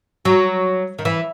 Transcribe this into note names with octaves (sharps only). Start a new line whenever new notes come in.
F#3
D#3
E3